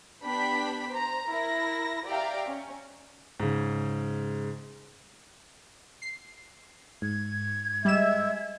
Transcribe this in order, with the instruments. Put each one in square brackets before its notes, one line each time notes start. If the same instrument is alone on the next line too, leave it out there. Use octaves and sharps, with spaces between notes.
[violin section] B3 D4 G4 G5 B5 B6
C5 A#5
E4 A#4 A#6
G4 D5 E5 F5 G5 A#5
C#4
[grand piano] G#2 C#3
[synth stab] C7
[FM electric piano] G#2 [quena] G#6
[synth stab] G3 E7 [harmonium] G#3 E5